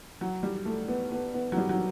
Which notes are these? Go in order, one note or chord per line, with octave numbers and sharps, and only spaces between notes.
F#3
G3
A3
B3
B3
B3
F#3
G3
F#3